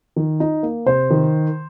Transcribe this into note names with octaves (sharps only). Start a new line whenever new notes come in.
D#3
D#4
A#3
C3 C5
D#3